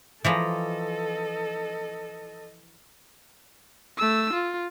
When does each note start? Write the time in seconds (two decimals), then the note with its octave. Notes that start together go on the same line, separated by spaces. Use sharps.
0.24 E3 F3 A4 D#5 A#5
3.98 A3 E6
4.33 F4